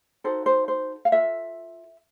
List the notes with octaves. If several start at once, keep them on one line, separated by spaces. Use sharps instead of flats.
D#4 F#4 A4 C5
C5
C5
F5
F4 A4 E5